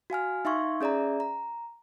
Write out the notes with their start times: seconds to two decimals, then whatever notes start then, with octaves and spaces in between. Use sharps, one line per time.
0.10 F#4 F5 G#5 F6
0.45 D#4 E5 F5 C6 C#6 G#6
0.81 C#4 G#4 D5 E5 A#5
1.20 A#5